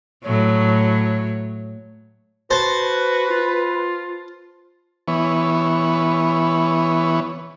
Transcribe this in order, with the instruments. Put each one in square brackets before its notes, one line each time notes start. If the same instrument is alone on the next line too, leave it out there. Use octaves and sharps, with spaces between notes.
[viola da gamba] A2 F#3 [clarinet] C#5
[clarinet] F#4 [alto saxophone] B4 [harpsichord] C5 A5
[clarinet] F4
[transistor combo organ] E3 B3 C#5